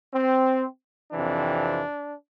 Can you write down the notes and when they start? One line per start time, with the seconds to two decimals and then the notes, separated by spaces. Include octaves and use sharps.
0.13 C4
1.11 F2 C3 E3 D4